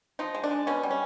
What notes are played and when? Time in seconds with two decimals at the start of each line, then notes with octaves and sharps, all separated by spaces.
0.19 F3 D#4
0.35 G#3
0.44 D4
0.51 G#3
0.67 B2 C#4
0.83 G3
0.91 C#4